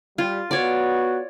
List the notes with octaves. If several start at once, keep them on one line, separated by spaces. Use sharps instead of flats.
G3 F4
B3 F#4 C#5 D5